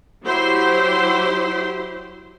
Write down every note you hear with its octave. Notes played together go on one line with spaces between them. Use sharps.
F#3 E4 G4 C5 C6